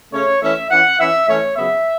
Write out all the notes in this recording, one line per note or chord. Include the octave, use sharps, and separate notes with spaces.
C#3 A3 C#4 C#5
E3 A3 C#4 E5
E3 C#4 F#5
E3 C#4 E5
A2 E3 A3 C#4 C#5
C#3 F#3 B3 E5